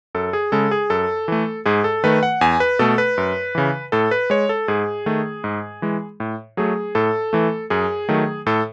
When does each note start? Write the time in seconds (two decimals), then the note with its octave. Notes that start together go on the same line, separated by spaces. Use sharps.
0.15 F#2 A4
0.33 G#4
0.52 C#3 G#3 A4
0.71 G#4
0.90 F#2 A4
1.28 E3 A3
1.66 G#2 G#4
1.84 A4
2.04 D#3 A3 B4
2.23 F#5
2.41 E2 G#5
2.60 B4
2.79 B2 A3 A4
2.98 B4
3.18 F#2
3.55 C#3 E3
3.92 A2 A4
4.11 B4
4.30 G#3 C#5
4.49 A4
4.68 G#2 G#4
5.06 D#3 A3
5.44 G#2
5.82 E3 G#3
6.20 A2
6.57 F#3 A3 G#4
6.95 A2 A4
7.33 E3 A3
7.70 F#2 G#4
8.08 D#3 F#3 A3
8.46 A2 A4